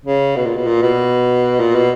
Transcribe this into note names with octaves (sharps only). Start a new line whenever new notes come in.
C#3
B2
A#2
B2
A#2
B2
A#2
B2